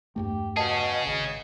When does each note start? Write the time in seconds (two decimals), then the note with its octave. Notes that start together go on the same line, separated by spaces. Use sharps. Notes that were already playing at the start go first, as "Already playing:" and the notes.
0.16 E2 G2 A3 G4
0.57 B2 C#4 G#4 D#5 A5
1.07 G#1 G#3